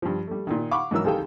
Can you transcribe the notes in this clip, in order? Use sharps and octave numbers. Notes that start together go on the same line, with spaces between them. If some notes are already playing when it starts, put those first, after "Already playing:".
G2 F3
G3 A3
A#2 D#3
F5 F#5 B5 C#6 D6
G#2 E3 F#3 A#4 E6
C2 D#3 G#4 A4 F5 G5